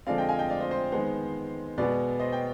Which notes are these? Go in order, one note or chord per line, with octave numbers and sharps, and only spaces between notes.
D3 F3 G#3 C4 D5 F5
D#5 G5
F5 G#5
D#5 G5
D5 F5
C5 D#5
C5
D#3 G#3 B3 C5
B2 G#3 B3 B4 D5
C5 D#5
G5